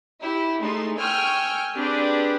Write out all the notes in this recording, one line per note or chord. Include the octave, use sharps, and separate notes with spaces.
E4 G4
G#3 A3 D#4 C6
G5 G#5 C#6 E6 F6 G6
C4 D4 G4 G#4 B4 D5